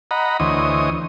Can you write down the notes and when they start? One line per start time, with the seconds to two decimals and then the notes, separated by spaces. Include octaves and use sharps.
0.11 D#5 F#5 A#5 B5
0.40 D2 E3 C5 C#5 D#5 D#6